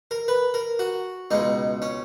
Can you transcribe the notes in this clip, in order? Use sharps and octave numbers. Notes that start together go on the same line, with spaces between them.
A#4
B4
A#4
F#4
C#2 B2 G#3 D#4
C#4